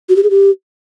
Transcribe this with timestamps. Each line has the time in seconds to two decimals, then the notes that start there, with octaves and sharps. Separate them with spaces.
0.09 F#4
0.16 G4
0.23 G#4
0.30 G4